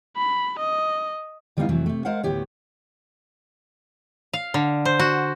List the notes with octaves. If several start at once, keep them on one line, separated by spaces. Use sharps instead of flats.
B5
D#5
D3 G3 B3 D#4 E4 F5
F2 C3 E3 F#3 A3
C3 A3
G#3 A#4 C5 F5 F#5
D2 A2 B3 G4 C#5
F5
D3
C5
F#4